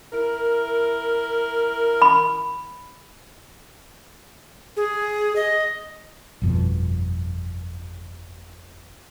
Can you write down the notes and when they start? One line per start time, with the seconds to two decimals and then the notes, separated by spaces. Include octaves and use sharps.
0.13 E4 A#4
2.02 B5
4.77 G#4
5.36 D#5
6.42 G1 F2 B2